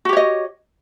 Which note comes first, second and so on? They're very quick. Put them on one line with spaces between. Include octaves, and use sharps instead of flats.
F#4 G4 C#5 D#5